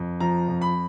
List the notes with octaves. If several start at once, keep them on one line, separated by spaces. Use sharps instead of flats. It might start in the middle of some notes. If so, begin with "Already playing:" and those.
Already playing: F2
F3 A#5
F2
B5